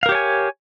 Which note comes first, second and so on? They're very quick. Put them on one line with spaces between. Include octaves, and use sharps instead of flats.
F5 A#4 G4 C#5 G#5